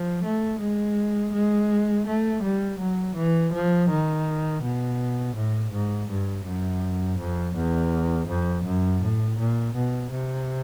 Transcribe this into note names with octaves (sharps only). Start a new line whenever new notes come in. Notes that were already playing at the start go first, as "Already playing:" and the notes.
Already playing: F3
A3
G#3
G#3
A3
G3
F#3
E3
F3
D#3
B2
A2
G#2
G2
F#2
F2
E2
F2
F#2
A2
A#2
B2
C3